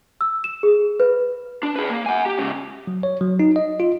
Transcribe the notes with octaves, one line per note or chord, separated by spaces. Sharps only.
E6
E7
G#4
B4
D4
G#4 B4
A#3
F#5 G#5
G4
G#2 C#3
F#3
C#5
F#3
D#4
D#5
F4